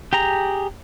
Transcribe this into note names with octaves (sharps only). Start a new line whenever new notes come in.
G4 G#4 A#5